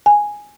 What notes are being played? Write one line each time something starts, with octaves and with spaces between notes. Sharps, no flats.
G#5